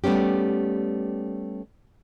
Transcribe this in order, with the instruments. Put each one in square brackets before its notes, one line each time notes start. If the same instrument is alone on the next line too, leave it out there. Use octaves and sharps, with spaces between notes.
[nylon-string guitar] G3 A3 B3 C#4 G4